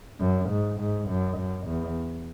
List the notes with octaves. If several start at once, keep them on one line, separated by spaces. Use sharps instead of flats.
F#2
G#2
G#2
F#2
F#2
E2